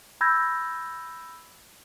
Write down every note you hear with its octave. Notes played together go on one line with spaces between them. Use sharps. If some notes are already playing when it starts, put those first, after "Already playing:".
B5 E6 G6 G#6 A#6